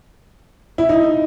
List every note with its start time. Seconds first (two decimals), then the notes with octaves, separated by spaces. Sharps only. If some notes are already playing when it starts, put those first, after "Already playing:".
0.78 E4
0.89 D#4